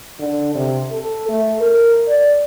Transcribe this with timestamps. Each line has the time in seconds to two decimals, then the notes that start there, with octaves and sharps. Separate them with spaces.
0.19 D3
0.55 C3
0.92 A4
1.29 A3
1.61 A#4
2.08 D5